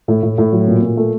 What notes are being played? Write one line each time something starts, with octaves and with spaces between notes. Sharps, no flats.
A2
A2
A2
F#3
A#2
A#2
A3